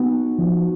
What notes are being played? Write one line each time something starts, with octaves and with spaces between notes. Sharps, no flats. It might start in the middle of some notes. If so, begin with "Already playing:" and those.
Already playing: B3 D#4 F#4
F3